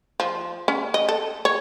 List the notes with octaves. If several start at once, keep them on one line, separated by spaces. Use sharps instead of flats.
F3
C#4
D#5
A4
C#5